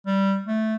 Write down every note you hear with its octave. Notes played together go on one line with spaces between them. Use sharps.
G3
A3